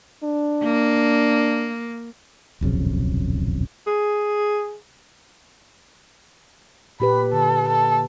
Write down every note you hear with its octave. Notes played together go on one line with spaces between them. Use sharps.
D4
A#3
D#1 B1 F2 C#3
G#4
A#2 G4 B4 B5
D3 A4
A4